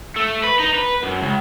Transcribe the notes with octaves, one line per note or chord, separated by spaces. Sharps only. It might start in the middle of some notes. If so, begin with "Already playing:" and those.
A3
B4
D#4
B4
F#2
C#2